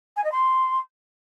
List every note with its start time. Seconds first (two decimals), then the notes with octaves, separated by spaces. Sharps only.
0.16 G#5
0.23 D#5
0.31 C6